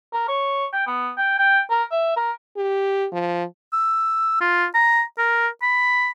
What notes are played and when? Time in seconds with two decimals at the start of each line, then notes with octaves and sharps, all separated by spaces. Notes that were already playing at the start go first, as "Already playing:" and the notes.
0.14 A#4
0.28 C#5
0.73 G5
0.87 B3
1.18 G5
1.39 G5
1.71 A#4
1.92 E5
2.17 A#4
2.57 G4
3.12 F3
3.73 E6
4.41 F4
4.74 A#5
5.18 A#4
5.62 B5